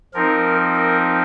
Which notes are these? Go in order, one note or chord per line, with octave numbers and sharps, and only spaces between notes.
F3 C4 D#4 A#4
A#4